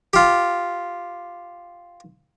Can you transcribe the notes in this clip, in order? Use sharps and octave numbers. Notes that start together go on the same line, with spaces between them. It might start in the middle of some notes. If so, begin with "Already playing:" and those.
F4 G4